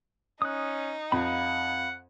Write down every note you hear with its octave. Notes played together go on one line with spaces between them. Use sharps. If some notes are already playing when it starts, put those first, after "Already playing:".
C#4 D#4 D#6 F#6
F2 F5 F#5 B5